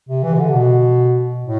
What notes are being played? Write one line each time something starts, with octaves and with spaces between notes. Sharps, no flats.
C3
E3
C3
D3
B2
A2